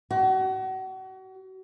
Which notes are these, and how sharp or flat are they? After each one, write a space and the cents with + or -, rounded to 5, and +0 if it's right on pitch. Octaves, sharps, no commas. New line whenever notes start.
F#4 +35